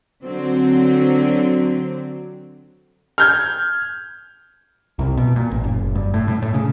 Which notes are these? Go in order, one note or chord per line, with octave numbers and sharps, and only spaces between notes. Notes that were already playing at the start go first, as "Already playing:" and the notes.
D3 F#3 C4
F6 G6 G#6
C2
B2
A#2
A1
F#1
G2
A2
A2
A2
C#3